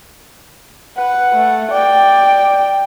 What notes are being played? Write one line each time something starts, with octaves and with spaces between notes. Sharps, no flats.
B4 F#5
A3
D5 G5